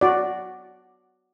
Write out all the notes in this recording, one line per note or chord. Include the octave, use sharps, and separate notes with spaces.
F#4 D5